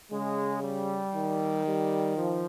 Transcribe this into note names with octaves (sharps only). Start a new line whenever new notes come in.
C#3 G#3
G3
D#3
G3
F3